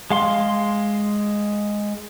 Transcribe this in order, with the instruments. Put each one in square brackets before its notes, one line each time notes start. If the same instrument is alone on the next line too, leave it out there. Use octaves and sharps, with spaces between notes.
[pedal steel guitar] G#3 F5 C6